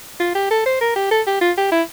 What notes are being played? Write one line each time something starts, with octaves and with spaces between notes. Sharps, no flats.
F4
G4
A4
C5
A#4
G4
A4
G4
F4
G4
E4